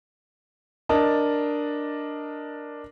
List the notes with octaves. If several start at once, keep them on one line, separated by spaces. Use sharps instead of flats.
D4 A#4 D#5 A5